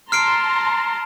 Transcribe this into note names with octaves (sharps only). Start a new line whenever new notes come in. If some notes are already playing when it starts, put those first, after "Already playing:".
A5 A#5 C6 F6 C7 D7